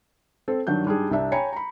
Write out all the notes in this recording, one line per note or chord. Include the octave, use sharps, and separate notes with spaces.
C4 A4 C5
G2 D#3 F#3 D4 G6
G#2 G3 D4 G#4
C2 D4 E5
C#5 G5 G#5 A#5 B5 C#7
A#5 B5